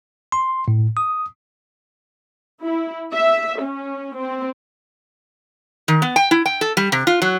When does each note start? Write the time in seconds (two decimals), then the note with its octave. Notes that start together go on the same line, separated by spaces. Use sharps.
0.32 C6
0.68 A2
0.97 D#6
2.62 E4
3.13 E5
3.62 C#4
4.17 C4
5.88 D#3
6.02 B3
6.16 G5
6.31 E4
6.46 G5
6.61 A4
6.77 G3
6.92 C3
7.07 F4
7.22 F#3